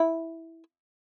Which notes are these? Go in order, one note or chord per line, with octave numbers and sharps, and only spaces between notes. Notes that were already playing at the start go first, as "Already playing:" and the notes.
Already playing: E4